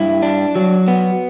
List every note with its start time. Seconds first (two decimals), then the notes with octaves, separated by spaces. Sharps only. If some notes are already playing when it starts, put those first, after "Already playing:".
Already playing: G2 E4
0.22 D4
0.55 F#3
0.88 B3